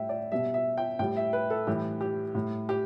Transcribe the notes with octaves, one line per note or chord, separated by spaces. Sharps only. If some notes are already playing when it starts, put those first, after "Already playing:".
Already playing: A2 G3 E5 G5
D5
B2 G3 E5
E5
G5
A2 G3 G5
E5
B4
A4
A2 E3 G3 G4
G4
A2 G3
G4